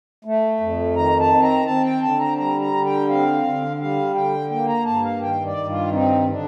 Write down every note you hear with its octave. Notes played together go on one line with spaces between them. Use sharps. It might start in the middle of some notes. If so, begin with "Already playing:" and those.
A3
F2
D#3 A#5
A5
C4
A#5
C4 A5
G5
D3 A5
A#5
G3 A#5
A#5
D3
G5
C4 F5
D3
G3 F5
D3 G5
A#3 G5
A#5
G2 A5
F5
D#3 G5
D5
G2
F4
C4 D#4
D3 D4